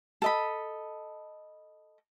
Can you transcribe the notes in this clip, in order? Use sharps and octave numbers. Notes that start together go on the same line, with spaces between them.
A4 D#5 B5